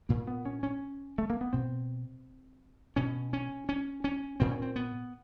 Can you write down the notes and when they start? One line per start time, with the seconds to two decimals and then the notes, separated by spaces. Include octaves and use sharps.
0.09 A#2 A#3
0.27 B3
0.45 C#4
0.63 C#4
1.18 A3
1.30 A#3
1.41 B3
1.53 B2 C4
2.96 B2 C#4
3.33 C#4
3.69 C#4
4.04 C#4
4.40 A#2 C4
4.52 C#4
4.62 C4
4.76 B3